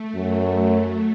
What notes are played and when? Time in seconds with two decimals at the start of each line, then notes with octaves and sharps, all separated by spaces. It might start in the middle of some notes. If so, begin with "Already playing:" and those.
Already playing: A3
0.14 F#2 F#3